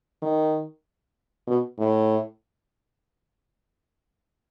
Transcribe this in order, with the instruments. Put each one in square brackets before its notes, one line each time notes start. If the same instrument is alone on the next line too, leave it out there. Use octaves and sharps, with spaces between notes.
[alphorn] D#3
B2
A2